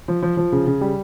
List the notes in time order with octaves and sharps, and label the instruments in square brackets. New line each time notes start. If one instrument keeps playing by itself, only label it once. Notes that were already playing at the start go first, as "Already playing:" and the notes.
[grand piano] F3
F3
F3
C#3
C#3
G3